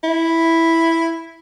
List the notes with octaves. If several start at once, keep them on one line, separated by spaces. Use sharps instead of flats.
E4